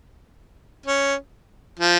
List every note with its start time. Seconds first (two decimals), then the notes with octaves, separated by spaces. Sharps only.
0.86 C#4
1.79 F3